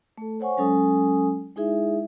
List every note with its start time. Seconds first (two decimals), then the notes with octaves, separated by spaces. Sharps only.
0.18 A3 A4
0.40 C5 C#5 F#5 G#5 C#6
0.57 F#3 G#3 C#4 A4 G#5 D#6
1.56 G#3 D#4 E4 G#4 E5